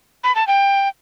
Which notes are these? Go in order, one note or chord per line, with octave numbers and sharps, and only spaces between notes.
B5
A5
G5